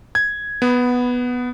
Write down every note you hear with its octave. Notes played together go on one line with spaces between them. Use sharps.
G#6
B3